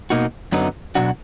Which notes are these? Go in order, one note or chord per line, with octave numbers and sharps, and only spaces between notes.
B2 A#3 D#4 F#4
F#2 D3 F#3 B3 D#4
B2 F#3 D4 F#4